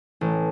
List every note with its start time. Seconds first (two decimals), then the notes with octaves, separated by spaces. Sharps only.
0.21 A1